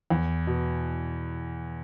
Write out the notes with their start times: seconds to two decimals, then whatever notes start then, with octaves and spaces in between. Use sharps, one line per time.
0.10 E2
0.47 B2